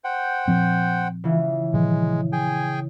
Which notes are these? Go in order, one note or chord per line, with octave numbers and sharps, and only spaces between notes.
C5 F#5 G5
A#2 F3 C4
C#3 E3
A#2 D#3 F3 G#3
G#4 G5 G#5